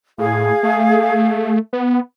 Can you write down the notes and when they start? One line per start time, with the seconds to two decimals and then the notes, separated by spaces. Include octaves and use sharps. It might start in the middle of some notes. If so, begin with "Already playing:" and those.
0.18 A2 G#4 F5
0.63 A3
1.73 B3